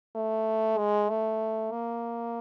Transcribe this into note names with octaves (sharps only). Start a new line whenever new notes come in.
A3
G#3
A3
A#3